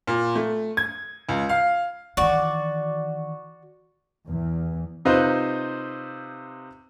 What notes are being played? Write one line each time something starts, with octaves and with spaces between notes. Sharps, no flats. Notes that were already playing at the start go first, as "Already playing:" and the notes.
A#2
A3
G#6
C#2
F5
D#3 E3 F#4 D5
E2
C3 D#4 F4 B4 C5